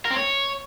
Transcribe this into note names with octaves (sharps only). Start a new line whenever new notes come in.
A#4
C4
C#5